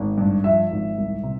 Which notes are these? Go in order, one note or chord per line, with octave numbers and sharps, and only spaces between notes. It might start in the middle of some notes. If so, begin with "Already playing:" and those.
Already playing: G#1
G2
F3 E5
G#1
C2
C3